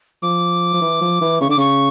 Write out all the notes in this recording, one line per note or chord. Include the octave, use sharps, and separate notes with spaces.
F3 D6
F3
E3
F3
E3
C#3 C#6
D3 D6
C#3 C#6